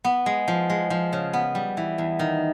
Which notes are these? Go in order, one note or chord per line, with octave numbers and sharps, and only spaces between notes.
B3
G#3
F3
G#3
F3
C#3
B3
G3
E3
E2
D#3